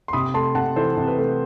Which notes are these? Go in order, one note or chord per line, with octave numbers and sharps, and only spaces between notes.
C6
C3 B5 D#6
A3 A5 C6
C3 F#5 A5
E3 A4 C5
C3
B4
A3